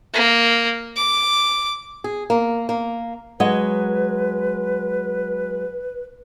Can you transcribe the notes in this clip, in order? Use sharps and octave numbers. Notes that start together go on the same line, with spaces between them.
A#3
D6
G#4
A#3
A#3
F#3 G#3 B4 D#5